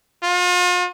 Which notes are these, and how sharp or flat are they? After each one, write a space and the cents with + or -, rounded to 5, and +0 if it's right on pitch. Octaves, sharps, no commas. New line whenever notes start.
F4 +40